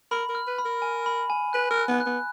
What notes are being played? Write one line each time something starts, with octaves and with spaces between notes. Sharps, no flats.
A#4 B5
A#4
F6
B4
B5
A#4
G#5
B5
G#5
B4 F#6
A#4
F#6
B3
F#6
B3